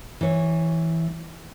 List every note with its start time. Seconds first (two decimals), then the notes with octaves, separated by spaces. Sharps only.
0.21 E3 C#5